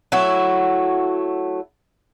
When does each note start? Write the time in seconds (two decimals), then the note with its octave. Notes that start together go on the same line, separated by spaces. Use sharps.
0.12 F#3 A3 E4 F#4